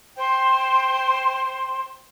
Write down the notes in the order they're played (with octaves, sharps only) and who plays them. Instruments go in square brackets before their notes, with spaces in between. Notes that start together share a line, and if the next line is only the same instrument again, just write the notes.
[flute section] C5 G5 C6